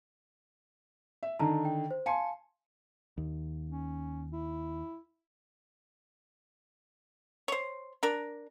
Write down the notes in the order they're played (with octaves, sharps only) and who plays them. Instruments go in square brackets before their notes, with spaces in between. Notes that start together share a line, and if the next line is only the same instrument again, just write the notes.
[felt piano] E5
[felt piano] D3 D#3 [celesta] A5 A#5
[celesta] G5
C5
[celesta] F5 A5 C#7 [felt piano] G#5 C6
[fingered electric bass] D#2
[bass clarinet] C#4
E4
[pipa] C5 C#5
D4 A#4